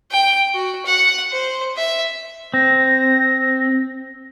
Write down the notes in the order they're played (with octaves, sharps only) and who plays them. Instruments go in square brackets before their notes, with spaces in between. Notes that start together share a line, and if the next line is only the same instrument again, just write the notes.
[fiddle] G5
F#4
F#5
C5
E5
[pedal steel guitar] C4 [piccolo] A#6